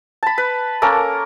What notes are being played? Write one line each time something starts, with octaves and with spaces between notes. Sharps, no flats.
A5 B5
B4
A#3 C#4 A4 A#4